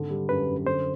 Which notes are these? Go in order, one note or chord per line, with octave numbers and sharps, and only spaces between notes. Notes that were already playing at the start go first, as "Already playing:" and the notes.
Already playing: G#1 D3
G3
F#2 B4
F#2
D3 C5